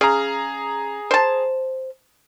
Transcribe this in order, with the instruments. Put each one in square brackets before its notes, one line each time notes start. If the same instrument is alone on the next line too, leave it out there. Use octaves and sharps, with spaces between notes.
[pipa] C#3 [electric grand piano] G#4 A#5
[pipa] C5 A5